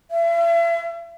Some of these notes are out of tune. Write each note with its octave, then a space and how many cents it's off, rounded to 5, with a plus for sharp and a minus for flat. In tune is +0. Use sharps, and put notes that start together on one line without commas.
E5 +40